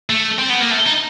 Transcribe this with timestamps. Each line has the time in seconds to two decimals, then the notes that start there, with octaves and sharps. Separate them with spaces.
0.10 A3
0.39 C4
0.50 B3
0.61 A#3
0.71 A3
0.87 D#4